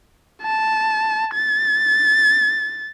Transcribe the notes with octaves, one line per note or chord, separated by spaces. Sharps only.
A5
A6